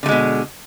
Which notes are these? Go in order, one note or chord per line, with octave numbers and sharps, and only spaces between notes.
B2 D3 G#3 A3